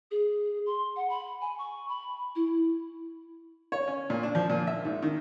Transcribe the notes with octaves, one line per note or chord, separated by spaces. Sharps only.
G#4
C6
F#5
B5
G#5
C#6
B5
E4
C#5
C#4
A#2
D4
F3
A#2
E5
G#2
D#3